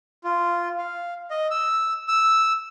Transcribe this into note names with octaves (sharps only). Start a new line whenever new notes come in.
F4
F5
D#5
E6
E6